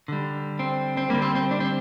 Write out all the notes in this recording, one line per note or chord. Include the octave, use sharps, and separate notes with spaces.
D3 G3
C4
C4
D3 G3 A#3
C4
C4
D4
C4